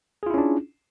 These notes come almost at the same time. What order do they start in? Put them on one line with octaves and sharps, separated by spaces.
G#4 F4 E4 C#4 D4